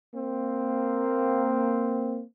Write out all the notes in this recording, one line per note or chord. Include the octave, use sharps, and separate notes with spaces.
A#3 C4